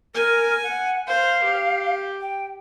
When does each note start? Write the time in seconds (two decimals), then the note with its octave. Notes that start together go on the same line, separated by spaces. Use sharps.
0.15 A#4 G#5
0.64 F#5
1.07 C5 F5
1.44 G4
2.21 G5